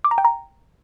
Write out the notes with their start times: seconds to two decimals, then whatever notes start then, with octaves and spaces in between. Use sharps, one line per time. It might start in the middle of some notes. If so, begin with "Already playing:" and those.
0.04 D6
0.11 A#5
0.18 G5
0.25 A#5